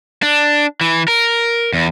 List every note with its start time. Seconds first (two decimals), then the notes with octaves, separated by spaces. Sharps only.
0.22 D4
0.81 E3
1.08 A#4
1.73 E2